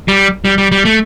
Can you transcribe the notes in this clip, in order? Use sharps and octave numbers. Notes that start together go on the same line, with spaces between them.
G3
G3
G3
G3
A3